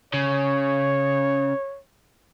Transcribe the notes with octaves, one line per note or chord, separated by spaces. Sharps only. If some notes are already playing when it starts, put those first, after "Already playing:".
C#3 C#5